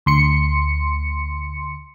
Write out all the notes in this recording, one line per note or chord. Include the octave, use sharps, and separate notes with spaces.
D2 C6 C#7